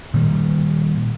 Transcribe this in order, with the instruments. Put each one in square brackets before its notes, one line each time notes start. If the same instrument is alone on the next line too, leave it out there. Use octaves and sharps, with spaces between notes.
[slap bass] A#2 D#3 G3